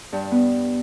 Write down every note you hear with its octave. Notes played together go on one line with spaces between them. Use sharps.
G2
B3